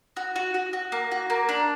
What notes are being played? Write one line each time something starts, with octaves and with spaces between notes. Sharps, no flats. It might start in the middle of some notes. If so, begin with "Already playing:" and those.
F#4
F#4
F#4
F#4
A#3
F#4
A#3
D4